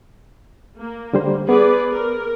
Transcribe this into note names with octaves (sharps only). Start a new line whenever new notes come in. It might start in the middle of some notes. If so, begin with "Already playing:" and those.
A#3
D3 G3 C5
B3 G#4 B4 D5
A#4